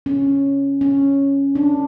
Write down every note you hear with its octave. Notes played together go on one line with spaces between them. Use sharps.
C#4
C#4
D4